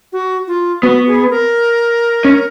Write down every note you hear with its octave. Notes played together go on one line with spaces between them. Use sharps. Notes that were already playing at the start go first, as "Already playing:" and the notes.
F#4
F4
B3 F#4
G#4
A#4
C#4